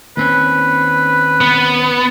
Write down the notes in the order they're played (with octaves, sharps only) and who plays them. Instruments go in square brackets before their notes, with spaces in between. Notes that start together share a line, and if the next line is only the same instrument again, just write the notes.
[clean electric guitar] D#2 C4 C#4 [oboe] B4
[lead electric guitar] B3